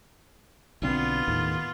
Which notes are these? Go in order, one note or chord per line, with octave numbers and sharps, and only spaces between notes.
B1 D3 B3 C4 F4
D#2 A2 D#3